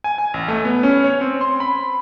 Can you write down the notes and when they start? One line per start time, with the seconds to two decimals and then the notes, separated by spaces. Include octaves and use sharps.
0.04 G#5
0.18 G#5
0.34 A1
0.48 A3
0.65 B3
0.83 C#4
1.04 C#5
1.21 C4
1.41 C6
1.60 B5